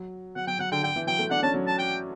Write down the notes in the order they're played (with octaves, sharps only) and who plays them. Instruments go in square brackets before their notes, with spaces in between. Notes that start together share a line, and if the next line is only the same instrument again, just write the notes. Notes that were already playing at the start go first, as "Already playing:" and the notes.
Already playing: [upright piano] F#3
[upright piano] F#3 [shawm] F#5
[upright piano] F#3 [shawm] G5
[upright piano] F#3 [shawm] F#5
[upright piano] D3 [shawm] G5
[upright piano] D3 [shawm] G5
[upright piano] E3
[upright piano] F#3 [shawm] G5
[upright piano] A3
[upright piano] D4 [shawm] F#5
[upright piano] C#4 [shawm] A5
[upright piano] F#3
[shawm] A5
G5